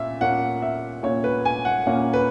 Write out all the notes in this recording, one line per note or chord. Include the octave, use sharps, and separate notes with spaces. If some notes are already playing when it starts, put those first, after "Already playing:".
Already playing: A#2 C#4 E5
A#2 A#3 C#4 F#5
E5
A#2 A#3 C#4 C#5
B4
G#5
F#5
A#2 A#3 C#4
B4